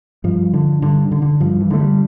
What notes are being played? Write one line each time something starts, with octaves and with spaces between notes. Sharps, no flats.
G2 F3
D3
G2 D3
D3
D3
G2 F3
E3
D3 A3
G3